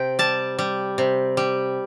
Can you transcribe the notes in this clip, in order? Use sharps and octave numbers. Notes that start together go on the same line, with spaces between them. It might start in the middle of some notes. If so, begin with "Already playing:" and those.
Already playing: C3 G5
G3 A5
G3
C3
G3